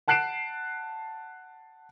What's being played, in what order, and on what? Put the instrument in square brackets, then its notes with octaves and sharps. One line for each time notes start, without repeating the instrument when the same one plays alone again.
[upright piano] F#5 A5 F#6 C7 D7 E7